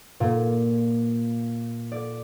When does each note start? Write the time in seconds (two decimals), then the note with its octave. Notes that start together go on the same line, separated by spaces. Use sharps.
0.20 A#2
1.92 D5